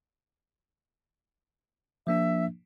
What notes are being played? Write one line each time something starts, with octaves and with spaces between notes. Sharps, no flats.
F3 A#3 D4 E5